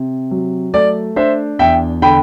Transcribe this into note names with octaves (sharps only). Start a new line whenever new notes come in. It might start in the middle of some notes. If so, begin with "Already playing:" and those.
Already playing: C3
F#3
A3 D5
D4 C5 E5
E2 E5 G5
D3 G5 B5